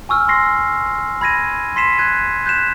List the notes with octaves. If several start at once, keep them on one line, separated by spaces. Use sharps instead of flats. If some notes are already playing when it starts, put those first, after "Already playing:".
G#5 C#6 E6 F6
C6 C#6 A#6 C7
B5 G#6 A#6 D#7
C6 B6 C7 E7
F#6 G#6 D#7
F#6 G6 B6 E7